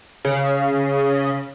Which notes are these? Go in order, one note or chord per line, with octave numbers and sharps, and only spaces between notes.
C#3